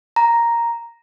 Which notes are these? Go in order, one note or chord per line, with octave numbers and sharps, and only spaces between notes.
A#5